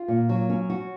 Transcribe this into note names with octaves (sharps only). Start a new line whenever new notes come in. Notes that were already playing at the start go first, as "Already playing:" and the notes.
Already playing: F4
A#2
F#3
C#4
F#4